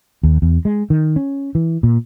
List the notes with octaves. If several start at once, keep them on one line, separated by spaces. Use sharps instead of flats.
D#2
E2
G#3
D#3
C#4
E3
A#2